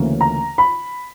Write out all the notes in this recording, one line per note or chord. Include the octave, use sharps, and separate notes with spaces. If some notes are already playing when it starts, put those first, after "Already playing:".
Already playing: D2 C#3 E3 A#3 C#4
A#5
B5